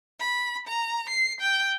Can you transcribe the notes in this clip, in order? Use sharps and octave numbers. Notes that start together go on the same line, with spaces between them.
B5
A#5
C7
G5